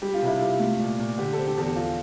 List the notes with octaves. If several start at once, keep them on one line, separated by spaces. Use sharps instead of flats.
G3 G4
F4
C3 E4
C3 F4
A3
A#2
A#2
D3 G4
C4 A4
G4
E2 G4 A4
F3 F4